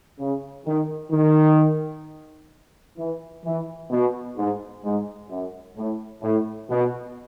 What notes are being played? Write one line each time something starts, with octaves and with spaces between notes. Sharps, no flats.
C#3
D#3
D#3
E3
E3
B2
G#2
G#2
F#2
A2
A2
B2